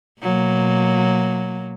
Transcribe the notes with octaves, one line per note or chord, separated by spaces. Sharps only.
B2 F#3 A#3